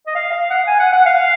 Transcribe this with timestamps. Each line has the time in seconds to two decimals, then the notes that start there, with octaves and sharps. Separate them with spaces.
0.07 D#5
0.15 F5
0.32 F5
0.50 F#5
0.67 G#5
0.79 F#5
0.93 F#5
1.06 F5